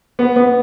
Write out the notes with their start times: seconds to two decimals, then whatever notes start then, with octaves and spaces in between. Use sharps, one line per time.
0.19 B3
0.36 B3